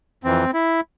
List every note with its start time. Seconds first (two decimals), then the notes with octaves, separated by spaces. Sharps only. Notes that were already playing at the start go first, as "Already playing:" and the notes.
0.24 F2 E3 C4
0.54 E4